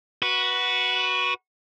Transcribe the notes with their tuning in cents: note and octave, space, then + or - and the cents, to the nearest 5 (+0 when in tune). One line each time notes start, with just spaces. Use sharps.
F#4 +0 B4 -15